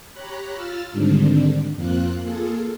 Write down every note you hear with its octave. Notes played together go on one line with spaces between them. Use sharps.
G4 C#5 A#5 B5 F#6
F4 E6 F6 A6
G#2 D3 D#3 G3 C4 D4
F2 A#3 C4 F4 F#6
A#3 F4 G#4 A4